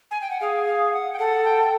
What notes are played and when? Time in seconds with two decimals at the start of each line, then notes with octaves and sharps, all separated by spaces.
0.11 G#5
0.22 G5
0.31 F#5
0.40 G#4 F5
0.67 F5
0.93 F#5
1.13 G5
1.18 A4 F#5
1.45 G5